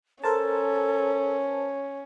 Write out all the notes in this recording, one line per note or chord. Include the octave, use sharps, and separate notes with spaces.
C#4 A4 A#4 C5 A5